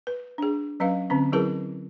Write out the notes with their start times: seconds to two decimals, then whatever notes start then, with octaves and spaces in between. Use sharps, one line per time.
0.07 B4
0.38 D4 G#4
0.80 F#3 C#4 B4 D#5 F5
1.10 D3 C4 C#4
1.33 F#3 E4 G#4 A#4 B4 A5